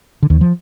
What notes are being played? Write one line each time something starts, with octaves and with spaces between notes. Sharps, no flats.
D3
D#2 D#3
F3